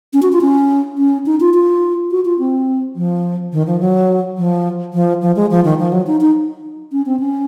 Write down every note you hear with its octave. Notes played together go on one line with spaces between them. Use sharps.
C#4
F#4
F4
C#4
C#4
D#4
F4
F4
F#4
F4
C4
F3
D#3
F3
F#3
F3
F3
F3
G#3
F3
D#3
F3
F#3
D#4
D#4
C#4
C4
C#4